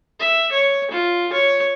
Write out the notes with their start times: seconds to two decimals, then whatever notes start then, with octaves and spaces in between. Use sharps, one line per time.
0.20 E5
0.52 C#5
0.91 F4
1.33 C#5